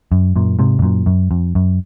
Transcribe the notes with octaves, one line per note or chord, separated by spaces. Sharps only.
F#2
F#2 A#2
G#2 C3
G#2
F#2 A#2
F#2
F2
F#2